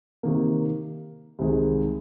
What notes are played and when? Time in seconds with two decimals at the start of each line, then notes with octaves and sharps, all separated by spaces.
0.23 C3 D#3 A#3
1.39 C2 C3 D#3 G#3